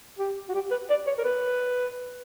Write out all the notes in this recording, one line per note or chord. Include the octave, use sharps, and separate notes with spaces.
G4
F#4
G4
B4
D5
C#5
A#4
B4